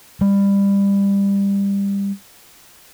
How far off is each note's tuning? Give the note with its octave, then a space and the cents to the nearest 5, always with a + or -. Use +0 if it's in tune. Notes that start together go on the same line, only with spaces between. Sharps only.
G3 +25